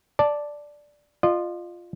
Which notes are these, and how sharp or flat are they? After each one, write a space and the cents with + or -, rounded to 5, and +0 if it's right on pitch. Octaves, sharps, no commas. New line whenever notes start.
D5 +0 A5 +0
F4 +0 D#5 -35